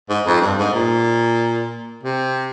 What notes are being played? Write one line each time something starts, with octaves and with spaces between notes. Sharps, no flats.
G#2
F2
G2
G#2
A#2
C3